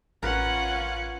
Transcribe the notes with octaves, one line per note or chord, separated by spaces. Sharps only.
A1 C#4 F4 A#4 B4 F#5